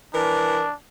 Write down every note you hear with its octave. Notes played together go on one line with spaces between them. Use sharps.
E3 D4 A#4